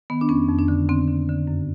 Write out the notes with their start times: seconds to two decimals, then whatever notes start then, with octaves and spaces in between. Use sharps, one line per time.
0.10 D#3 B3
0.21 D4
0.29 F2 C#4
0.49 F2
0.59 D4
0.68 D3
0.89 D3 C4
1.08 D3
1.29 D3
1.47 F#2